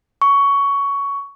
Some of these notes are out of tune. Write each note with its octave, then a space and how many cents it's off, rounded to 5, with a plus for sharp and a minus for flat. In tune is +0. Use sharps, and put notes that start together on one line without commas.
C#6 +15